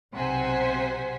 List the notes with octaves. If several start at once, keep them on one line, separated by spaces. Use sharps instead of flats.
B1 C3 C5 F#5 G#5 B6